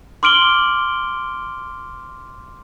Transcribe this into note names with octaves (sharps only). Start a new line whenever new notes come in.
C6 D6 F6 D7 F#7 G7